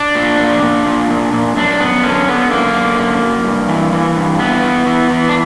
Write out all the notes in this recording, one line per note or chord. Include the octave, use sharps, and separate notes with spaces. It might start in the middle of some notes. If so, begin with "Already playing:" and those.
Already playing: D4
A#2
A#2
A#2
A#2
A#2
A#2
F#2 D4
F#2 B3
D3 C#4
D3 B3
F#2 A#3
D3
F#2
F#2
G2
E3
E3
G2
E3 B3
E3
E3
E3
D4